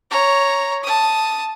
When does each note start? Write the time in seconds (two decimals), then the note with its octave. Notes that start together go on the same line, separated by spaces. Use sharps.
0.11 C#5 A#5
0.84 A5 D#6